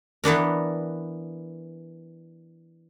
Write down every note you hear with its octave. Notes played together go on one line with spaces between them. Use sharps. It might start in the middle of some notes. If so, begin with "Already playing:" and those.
E3 B3 D4 A#4